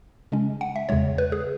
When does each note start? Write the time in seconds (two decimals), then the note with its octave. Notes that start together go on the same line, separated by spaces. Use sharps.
0.32 C#3 G#3 C#4
0.61 F#5
0.76 E5
0.89 E2 C#3 G#3 C#5
1.18 B4
1.32 G#4